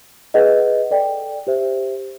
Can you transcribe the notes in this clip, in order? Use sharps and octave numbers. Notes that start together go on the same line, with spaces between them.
G#4 B4 D#5 F#5
A4 D5 G5
G4 C5 E5